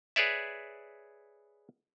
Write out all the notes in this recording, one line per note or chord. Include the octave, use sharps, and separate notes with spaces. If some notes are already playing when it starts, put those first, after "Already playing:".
G#4 B4 C#5 D5 E5